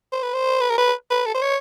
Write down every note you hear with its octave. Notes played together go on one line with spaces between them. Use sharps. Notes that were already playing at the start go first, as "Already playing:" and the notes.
C5
B4
C5
B4
A#4
B4
B4
A4
C5
C#5